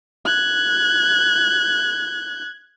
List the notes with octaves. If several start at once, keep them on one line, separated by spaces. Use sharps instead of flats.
F#6 G#6